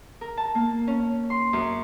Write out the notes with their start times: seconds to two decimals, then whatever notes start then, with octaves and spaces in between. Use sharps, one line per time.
0.21 A#4
0.37 A5
0.55 A#3
0.87 C#4
1.30 C6
1.53 F#2